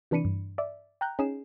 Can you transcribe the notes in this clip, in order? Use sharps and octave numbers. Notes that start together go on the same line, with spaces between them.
C3 E3 D4 B5 C#7 D#7
G2
D5 E5
G5 A#5 F#6 G6
C#4 D#4 G#4 C7 E7